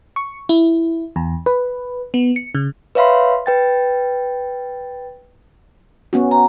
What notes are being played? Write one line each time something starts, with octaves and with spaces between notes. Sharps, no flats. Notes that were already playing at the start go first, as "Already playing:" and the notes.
C#6
E4
E2
B4
B3
C#7
C#3
B4 C#5 E5 F5 B5 C6
B4 G5 A6
B3 C#4 F#4
A#5